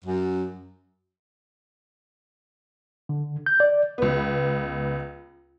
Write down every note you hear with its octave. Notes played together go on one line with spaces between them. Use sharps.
F#2
D3
G6
D5
C#2 B3